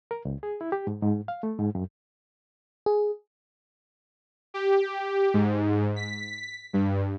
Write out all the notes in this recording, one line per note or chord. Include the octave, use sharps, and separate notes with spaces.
A#4
C#2
G#4
E4
G4
G#2
G#2
F5
A3
G#2
F#2
G#4
G4
G#2
B6
G2